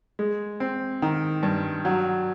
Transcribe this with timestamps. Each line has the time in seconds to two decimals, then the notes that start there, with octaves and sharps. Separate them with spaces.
0.19 G#3
0.60 C4
1.02 D#3
1.43 G2
1.85 F#3